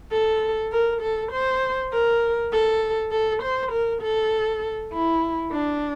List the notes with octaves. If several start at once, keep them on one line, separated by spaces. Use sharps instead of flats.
A4
A#4
A4
C5
A#4
A4
A4
C5
A#4
A4
E4
D4